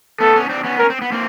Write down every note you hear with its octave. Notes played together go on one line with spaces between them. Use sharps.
A3 B3 A4
B3 C#4
C4 D4
B3 C#4
C#4 A#4
C4
B3
A#3 C4